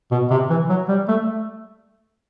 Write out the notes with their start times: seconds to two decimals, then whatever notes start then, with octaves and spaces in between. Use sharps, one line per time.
0.11 B2
0.31 C3
0.50 E3
0.69 F#3
0.89 G3
1.08 A3